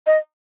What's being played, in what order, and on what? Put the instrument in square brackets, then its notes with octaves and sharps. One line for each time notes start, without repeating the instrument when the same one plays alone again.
[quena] D#5